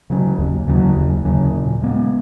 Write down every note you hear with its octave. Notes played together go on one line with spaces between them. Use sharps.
C#3 F#3 C#4
D#2
C#3 F#3 C#4
D#2
C#3 F#3 C#4
A#2
G#3 B3